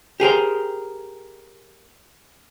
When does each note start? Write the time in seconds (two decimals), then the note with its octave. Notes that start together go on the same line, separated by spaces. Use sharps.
0.20 G4 G#4 A#4 C5